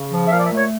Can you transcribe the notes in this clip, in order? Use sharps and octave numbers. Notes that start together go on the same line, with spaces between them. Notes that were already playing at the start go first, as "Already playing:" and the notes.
Already playing: C#3
F3
E5
A#2 F5
D5
E5
A3
C#5